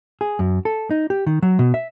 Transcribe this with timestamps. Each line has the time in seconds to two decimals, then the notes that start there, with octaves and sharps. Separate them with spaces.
0.21 G#4
0.39 F#2
0.65 A4
0.91 D#4
1.10 G4
1.26 D#3
1.42 F#3
1.59 B2
1.74 E5